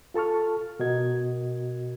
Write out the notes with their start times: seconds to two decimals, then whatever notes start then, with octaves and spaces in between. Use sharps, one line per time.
0.14 F4 A4 A5 C#6 F6
0.79 B2 F#4 A#4 D#5 G#6